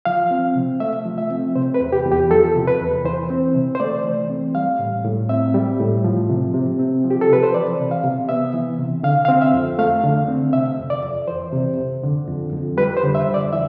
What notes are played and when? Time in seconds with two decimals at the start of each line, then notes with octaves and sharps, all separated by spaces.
0.05 F3 F5
0.31 C4
0.55 C3
0.80 A3 E5
1.06 F3
1.18 E5
1.30 C4
1.55 C3 C5
1.74 B4
1.80 E2
1.93 G4
2.05 E2
2.12 G4
2.30 F3 A4
2.55 C3
2.67 B4
2.80 E2
3.05 E3 C5
3.30 C4
3.55 C3
3.75 C5
3.80 A3 D5
4.04 E3
4.30 C4
4.55 G3 F5
4.79 A2
5.05 A2
5.29 C4 E5
5.54 G3
5.80 A2
6.04 F3
6.30 C3
6.54 C3
6.80 C4
7.04 F3
7.10 G4
7.21 A4
7.29 C3 B4
7.43 C5
7.54 E3 D5
7.79 C3
7.91 F5
8.04 C3
8.29 B3 E5
8.54 E3
8.79 C3
9.03 D3 F5
9.25 F5
9.29 C4
9.41 E5
9.54 F2
9.78 A3 F5
10.03 D3
10.28 C4
10.53 C3 E5
10.79 F2
10.90 D5
11.03 F2
11.28 E3 C5
11.53 C3
11.78 F2
12.03 D3
12.28 F2
12.53 F2
12.77 G3 B4
12.97 C5
13.03 D3
13.15 E5
13.28 F2
13.34 D5
13.53 E3 E5